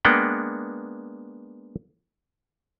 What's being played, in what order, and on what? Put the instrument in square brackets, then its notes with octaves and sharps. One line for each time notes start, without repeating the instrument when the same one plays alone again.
[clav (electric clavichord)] G#3 A#3 B3 D4 F#5 G5